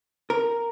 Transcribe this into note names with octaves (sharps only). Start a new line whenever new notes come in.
A#4